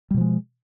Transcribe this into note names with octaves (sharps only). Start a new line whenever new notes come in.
B2 F3 G3 G#3